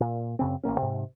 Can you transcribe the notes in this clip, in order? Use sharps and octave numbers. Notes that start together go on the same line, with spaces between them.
A#2
F#2 C#3 C4
A1 F#3 A#3 C#4
G#2 C3